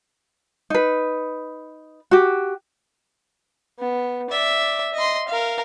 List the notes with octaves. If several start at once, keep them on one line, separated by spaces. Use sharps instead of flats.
D#4 B4
F#4 G4
B3
D5 E5
D#5 C6
A#4 F5